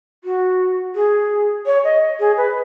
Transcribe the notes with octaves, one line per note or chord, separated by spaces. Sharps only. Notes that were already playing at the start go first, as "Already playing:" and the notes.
F#4
G#4
C#5
D#5
G#4
B4